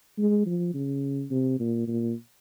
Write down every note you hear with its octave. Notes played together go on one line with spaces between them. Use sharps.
G#3
F3
C#3
C3
A#2
A#2